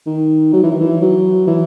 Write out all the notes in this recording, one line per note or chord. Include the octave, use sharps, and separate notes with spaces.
D#3
F#3
E3
D#3
E3
F#3
E3